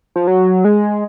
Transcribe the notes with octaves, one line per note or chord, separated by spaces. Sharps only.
F3
F#3
G#3